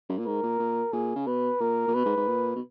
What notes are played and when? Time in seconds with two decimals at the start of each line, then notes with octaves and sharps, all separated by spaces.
0.09 F#2
0.18 A#2
0.26 G#2 A#4
0.43 A#2
0.59 A#2
0.93 A#2 G#4
1.15 C#3
1.27 B2 B4
1.60 A#2 A#4
1.88 A#2
1.94 B2 B4
2.05 G#2
2.16 G#2
2.28 A#2
2.55 B2